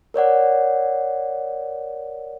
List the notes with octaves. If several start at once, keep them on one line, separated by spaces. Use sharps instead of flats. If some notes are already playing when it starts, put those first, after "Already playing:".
A#4 C#5 D5 F#5